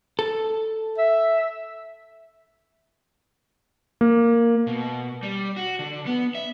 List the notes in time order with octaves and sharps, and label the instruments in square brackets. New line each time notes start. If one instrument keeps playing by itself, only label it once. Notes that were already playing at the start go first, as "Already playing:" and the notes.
[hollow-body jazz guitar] A4
[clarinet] E5
[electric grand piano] A#3
[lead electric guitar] B2
G3
F#4
D3
B3
E5